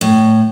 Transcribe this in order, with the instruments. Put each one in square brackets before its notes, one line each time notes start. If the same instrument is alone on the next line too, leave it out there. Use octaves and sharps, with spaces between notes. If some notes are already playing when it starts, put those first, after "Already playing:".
[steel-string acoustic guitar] A2